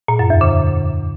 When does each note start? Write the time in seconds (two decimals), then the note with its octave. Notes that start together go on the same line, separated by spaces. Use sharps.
0.08 A#2
0.19 F#2
0.30 E2
0.41 D3